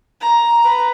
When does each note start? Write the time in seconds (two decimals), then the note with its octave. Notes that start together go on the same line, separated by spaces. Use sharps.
0.21 A#5
0.61 B4 A#5